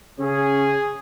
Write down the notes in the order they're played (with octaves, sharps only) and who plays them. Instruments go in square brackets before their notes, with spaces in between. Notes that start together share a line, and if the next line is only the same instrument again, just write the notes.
[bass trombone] C#3 [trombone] C#4 [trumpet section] G#4